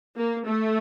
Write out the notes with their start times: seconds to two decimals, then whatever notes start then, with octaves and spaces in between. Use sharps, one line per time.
0.16 A#3
0.46 A3